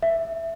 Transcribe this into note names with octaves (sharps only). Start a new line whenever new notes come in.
E5